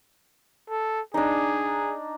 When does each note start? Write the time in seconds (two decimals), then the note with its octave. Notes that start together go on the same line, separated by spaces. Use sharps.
0.70 A4
1.14 D4 D#4 G#4